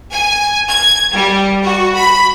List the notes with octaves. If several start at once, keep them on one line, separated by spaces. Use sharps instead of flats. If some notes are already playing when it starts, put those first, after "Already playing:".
G#5
G#6
G3
F#4
B5